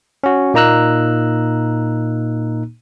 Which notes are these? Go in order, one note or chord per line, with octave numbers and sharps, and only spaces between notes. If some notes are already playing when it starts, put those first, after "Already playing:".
C#4 F#4
A#2 A#3 D#4 A#5 E6 F#6